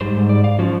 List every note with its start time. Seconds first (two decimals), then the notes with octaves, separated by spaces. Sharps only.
0.01 G#2 G3 C5
0.29 D5
0.44 F5
0.59 F3 C#4 F#4 D5